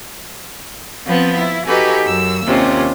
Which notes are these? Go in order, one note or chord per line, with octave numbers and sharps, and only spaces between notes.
F3 B3 C4
E4
D#4 F#4 G4 A4 B4 G#5
F#2 E6
D#2 C3 C#4 F4